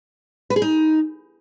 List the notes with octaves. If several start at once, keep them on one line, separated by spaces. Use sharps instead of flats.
B4
G#4
D#4